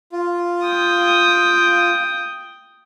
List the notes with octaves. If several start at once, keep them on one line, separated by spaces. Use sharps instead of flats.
F4
G5 D#6